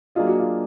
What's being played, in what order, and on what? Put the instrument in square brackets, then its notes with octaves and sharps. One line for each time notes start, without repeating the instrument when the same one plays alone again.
[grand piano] F#3 A#3 D4 G#4 D#5 [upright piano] F4
[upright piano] F#4
F4